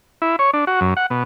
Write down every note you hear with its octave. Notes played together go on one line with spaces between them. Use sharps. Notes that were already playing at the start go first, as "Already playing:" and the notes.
E4
C#5
D4
F#4
F#2
F#5
B2